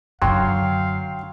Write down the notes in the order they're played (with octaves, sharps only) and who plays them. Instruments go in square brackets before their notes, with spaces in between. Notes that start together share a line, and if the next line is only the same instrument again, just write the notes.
[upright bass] F#2 D3 [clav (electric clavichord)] F#3 [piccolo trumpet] F5 [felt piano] G5 C6